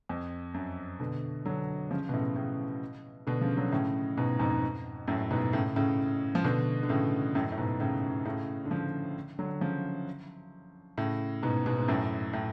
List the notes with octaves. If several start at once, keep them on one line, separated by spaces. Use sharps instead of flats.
F2
F#2
B2 D3
D3 F#3
C#3 F3
B2
A2 C#3
A2 C#3
B2 D3
C#3 F3
D3 F#3
A2 C#3
G#2 B2
F2 G#2
F#2 A2
G#2 B2
A2 C#3
A2 C#3
F3
B2 D3
D3
A2 C#3
F#2 A2
A2
G#2 B2
A2 C#3
A2 C#3
D3
C#3 F3
D3 F#3
C#3 F3
A2 C#3
G#2 B2
G#2 B2
G#2
F#2 A2
A2